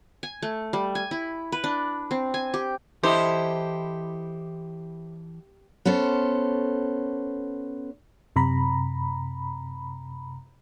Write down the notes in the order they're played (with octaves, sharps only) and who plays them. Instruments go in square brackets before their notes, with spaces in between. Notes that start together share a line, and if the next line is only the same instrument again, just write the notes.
[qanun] G#5
A3
G3
G#5
E4
B4
D4
C4
G#5
G4
[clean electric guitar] E3 A4 D#5 [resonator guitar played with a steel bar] E4 [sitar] G4 [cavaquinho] C5
[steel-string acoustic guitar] B3 C#4 A4 C5
[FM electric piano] F#2 C3 A#5 B5